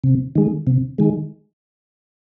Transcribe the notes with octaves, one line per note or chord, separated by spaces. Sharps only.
C3
D#3 G#3
C3
D#3 G#3